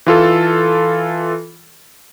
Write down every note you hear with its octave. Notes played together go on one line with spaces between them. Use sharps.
E3 F4 A4